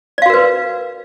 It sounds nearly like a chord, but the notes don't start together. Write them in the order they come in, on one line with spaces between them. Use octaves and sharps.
D5 F5 F#4 A#4 B4